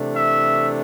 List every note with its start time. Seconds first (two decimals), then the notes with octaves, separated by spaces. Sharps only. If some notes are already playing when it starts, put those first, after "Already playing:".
Already playing: C3 E3 A3 D4
0.15 E5